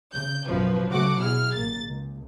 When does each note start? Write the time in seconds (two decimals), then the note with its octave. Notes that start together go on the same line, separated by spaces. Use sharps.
0.13 C#3 G6
0.46 A1 F#2 B2 F3 B4
0.89 C#3 F#3 A3 F#4 F#5 D6
1.19 B2 E4 G#4 F6
1.55 A1 A#3 A6
1.84 C#2